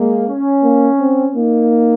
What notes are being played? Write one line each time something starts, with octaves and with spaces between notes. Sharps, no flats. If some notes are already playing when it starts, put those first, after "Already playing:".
Already playing: G#3 A#3
C#4
A#3
C4
A#3 D#4